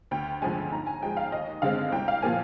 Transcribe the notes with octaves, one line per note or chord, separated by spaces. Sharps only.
D2 G5
D3 F3 G#3 G#5
G#2 A#5
G#5
F3 G#3 G5
F5
D#2 D#5
D3 G#3 C4 F5
C2 G5
F5
A#2 F3 A#3 G#5